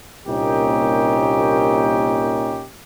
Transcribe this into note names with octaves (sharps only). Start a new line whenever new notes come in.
C2 A#2 A#3 C#4 D#4 G4